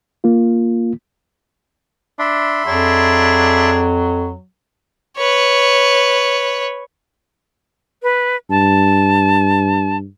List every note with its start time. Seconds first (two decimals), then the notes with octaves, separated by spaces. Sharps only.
0.24 A#3 F4
2.19 D4 E5 B5 C6
2.65 F2 F#3 D4 G#4
5.17 B4 C#5
8.03 B4
8.50 G2 A5